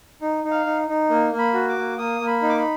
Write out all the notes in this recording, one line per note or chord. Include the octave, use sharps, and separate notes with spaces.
D#4
D#4
F5
D#4
D#4
A#3
A#3
B5
F#4
D6
A#3
A#3 D#6
A#3
B5
D#4
D6
B5